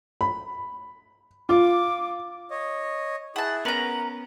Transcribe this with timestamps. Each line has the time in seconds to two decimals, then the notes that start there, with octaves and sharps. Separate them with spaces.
0.21 B5
1.49 F4 D6
2.51 C#5 D#5
3.36 E4 G#4 F#5 A5
3.65 B3 C#4 A#4 B4 F#5 A#5